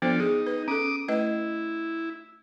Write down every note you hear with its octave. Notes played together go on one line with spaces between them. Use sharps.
F3 B3 D4 A4 C5
D#4 G#4
B4
C#4 A4 D6 D#6
A3 E4 B4 D#5